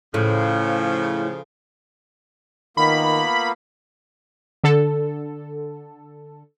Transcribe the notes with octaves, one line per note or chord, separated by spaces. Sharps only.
A2 C#3 F3
D#3 A#3 B3 F4 B5
D3 A4